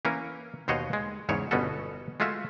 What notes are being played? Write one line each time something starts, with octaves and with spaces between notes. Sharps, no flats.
E3 A#3 C#4 A#4
D#2 B2 C5 C#5 D#5 F#5
G#3
E2 G#2 C#3 C#5
G1 B2 B3 C#4 F#4 A4
G#3 A3 F4 F#4 E5